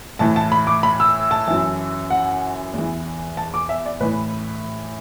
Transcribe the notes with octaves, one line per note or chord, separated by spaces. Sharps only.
A2 E3 A5
A5
B5
D6
B5
E6
A5
F#2 E3
F#5
E2 E3
A5
D6
E5
D5
A2 E3 B4